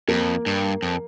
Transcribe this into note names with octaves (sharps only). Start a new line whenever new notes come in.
F2 A#3
G2
F2